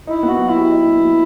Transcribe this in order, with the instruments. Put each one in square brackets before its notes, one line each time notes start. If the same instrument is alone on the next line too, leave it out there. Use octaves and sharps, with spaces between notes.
[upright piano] D#4 [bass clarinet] E4
[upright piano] B3
[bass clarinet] F#4
[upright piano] F#3
[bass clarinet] E4
[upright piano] G4
D#4
B3
F#3